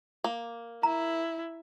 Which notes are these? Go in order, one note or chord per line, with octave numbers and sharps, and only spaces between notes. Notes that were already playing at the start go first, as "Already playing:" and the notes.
A#3
E4 A#5